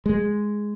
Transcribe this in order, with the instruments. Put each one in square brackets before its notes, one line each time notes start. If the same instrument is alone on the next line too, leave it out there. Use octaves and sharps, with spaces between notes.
[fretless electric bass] G#3